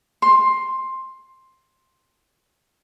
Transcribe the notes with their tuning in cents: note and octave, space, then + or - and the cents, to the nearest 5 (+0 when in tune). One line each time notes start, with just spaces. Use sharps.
C6 +10